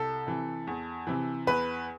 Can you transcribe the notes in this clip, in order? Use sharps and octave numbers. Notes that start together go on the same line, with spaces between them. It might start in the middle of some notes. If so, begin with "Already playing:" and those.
Already playing: C2 A4
C3 E3
E2
C3 E3
E2 B4